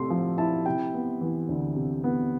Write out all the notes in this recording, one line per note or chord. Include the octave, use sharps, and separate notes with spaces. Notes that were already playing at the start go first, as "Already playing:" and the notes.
Already playing: C3 A3 C6
F3
E4 A5
C3 G5
B3
E3
D2
C3
B3